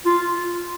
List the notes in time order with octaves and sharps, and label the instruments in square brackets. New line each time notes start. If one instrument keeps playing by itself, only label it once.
[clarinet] F4